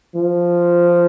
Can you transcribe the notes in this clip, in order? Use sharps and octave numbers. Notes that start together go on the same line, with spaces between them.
F3